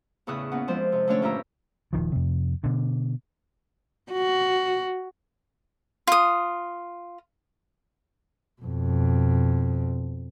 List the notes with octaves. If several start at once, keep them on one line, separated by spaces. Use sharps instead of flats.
E2 A2 C#3 E4 D#6 F#6
A#3 B3 C#4 F#5
F2 F3 G#3 C5
C3
D3 A3 C#4 D4 C#5
G2 A#2 G4 C#5 A#5 E6
D#1 A#1 D#3 F3
F2 C3
B2 D3
F#4
F4 D#6
F2 B2